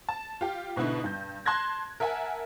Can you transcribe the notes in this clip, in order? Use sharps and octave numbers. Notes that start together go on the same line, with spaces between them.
A5
F4 G4
G#2 B2 D3 B3 E4
G2 G6
A5 C6 F#6 G#6 A#6
A#4 E5 F#5 G#5 A5